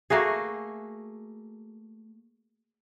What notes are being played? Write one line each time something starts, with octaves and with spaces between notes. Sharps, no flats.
A3 A#3 F#4 G#4